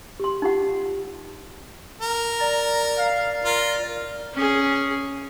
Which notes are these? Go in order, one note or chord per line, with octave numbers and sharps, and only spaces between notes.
G4 C6
D#4 F4 G4 F#5
A#4
D5 A#5
F5
F4 A#4
C#4 G#4